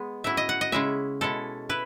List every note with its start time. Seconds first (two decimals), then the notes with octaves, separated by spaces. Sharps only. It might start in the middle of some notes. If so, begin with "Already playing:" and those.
Already playing: G#3 B3
0.24 A2 F#3 C#4 E4 E5
0.37 D#5
0.49 F#5
0.61 D#5
0.72 C#3 G#3 C#4 E4 E5
1.21 B2 G#3 C#4 E4 A4
1.69 E4 B4